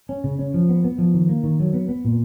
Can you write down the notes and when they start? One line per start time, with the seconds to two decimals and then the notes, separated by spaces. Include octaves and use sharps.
0.09 C#4
0.24 C#3
0.39 C#4
0.54 F3
0.69 B3
0.84 B3
0.98 F3
1.14 D#3
1.29 A#3
1.43 D#3
1.60 F#3
1.74 B3
1.89 B3
2.05 A#2